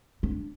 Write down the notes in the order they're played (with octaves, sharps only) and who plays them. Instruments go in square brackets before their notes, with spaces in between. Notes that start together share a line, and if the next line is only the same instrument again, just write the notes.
[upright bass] D4